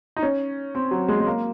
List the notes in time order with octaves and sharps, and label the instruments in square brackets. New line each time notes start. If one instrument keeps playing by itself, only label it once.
[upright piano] D#4
C#4
C4
F#3
G#3
G#3
A#3